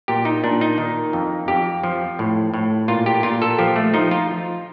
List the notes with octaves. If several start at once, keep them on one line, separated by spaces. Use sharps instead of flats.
A#2 G4
D#4
A#2 D4
D#4
D#3
F2
F2 G4
F3
A2
A2
A#2 F4
G4
A#2 F4
A4
F3 G4
A3
F3 D#4
F4